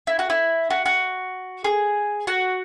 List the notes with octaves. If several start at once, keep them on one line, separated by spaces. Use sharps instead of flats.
E4
F#4
E4
F#4
F#4
G#4
F#4